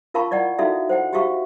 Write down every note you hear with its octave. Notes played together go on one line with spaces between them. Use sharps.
F4 A#4 F5 A5 B5 C#6
E4 D5 D#5 F#5
D#4 E4 F#4 A4 E5 F5
C5 F#5 G5
F#4 G4 E5 F5 C#6